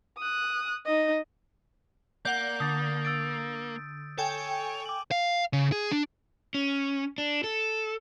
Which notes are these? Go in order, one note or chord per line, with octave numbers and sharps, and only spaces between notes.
D#6 F#6
D#4 D#5
A#3 D5 F#5 G6 G7
D3 D#6 A6
E6 A6 D7
A4 C#5 G5 G#5
D6 F#7
F5
C#3
G#4
D4
C#4
D4
A4